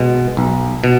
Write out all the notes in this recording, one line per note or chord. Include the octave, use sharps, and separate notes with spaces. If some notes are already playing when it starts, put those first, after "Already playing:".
Already playing: B2 G#3
B1
B2